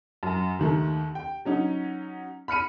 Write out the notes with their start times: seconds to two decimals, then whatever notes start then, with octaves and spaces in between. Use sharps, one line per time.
0.23 F#2
0.59 D#2 D#3 A3
1.15 G5
1.45 F#3 C#4 D#4
2.48 B5 F6 C#7 D#7